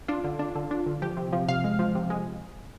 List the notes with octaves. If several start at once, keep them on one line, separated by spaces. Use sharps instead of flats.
D4 F4
D3
D4
D3
D4
D3
F3 G4
C3
F3
C3 F5
G#3
F3
C3
G#3